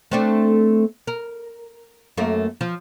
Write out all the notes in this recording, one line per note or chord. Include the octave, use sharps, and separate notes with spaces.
A3 C4 D4
A#4
F#2 A3 A#3
F3